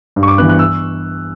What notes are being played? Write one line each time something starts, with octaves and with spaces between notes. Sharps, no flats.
G2
C#6
D6
E3 B3 F#6
F#6
E6